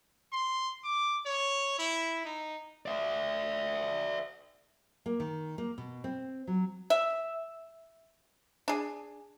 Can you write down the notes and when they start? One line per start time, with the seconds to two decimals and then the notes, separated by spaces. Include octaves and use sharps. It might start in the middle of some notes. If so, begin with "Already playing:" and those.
0.32 C6
0.84 D6
1.26 C#5
1.79 E4
2.25 D#4
2.86 D5 E5
5.06 A#3
5.20 D#3
5.58 A#3
5.78 B2
6.04 C4
6.47 F#3
6.90 E5
8.68 D4 G#4